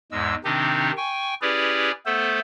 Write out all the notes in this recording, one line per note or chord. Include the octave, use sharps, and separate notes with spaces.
E2 G#2 G#3 E6
C3 D#3 C4 D4 D#4 G4
G5 G#5 C#6
C#4 E4 G4 G#4 B4 D5
A3 B3 A4 C5